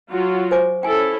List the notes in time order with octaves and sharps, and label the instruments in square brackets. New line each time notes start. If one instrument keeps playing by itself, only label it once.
[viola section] F#3 F4 F#4
[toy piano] C5 G#5 D6
[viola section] C#4 E4 A4 [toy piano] G5 G#5